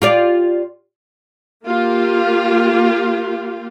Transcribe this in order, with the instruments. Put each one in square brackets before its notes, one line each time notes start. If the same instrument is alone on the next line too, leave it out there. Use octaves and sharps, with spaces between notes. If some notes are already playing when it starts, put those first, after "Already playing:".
[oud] F4 G4 D5
[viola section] A#3 F4 G4